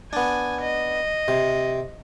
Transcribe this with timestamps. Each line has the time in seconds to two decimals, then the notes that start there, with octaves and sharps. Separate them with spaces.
0.13 B3 D4 G#5
0.61 D#5
1.28 C3